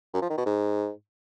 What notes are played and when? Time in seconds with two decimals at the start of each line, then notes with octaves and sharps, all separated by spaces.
0.14 F#2
0.22 F3
0.30 D#3
0.38 B2
0.46 G#2